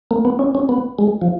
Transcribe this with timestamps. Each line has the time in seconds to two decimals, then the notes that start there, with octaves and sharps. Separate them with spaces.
0.11 A#3
0.25 B3
0.39 C#4
0.55 C#4
0.69 B3
0.99 G#3
1.22 F3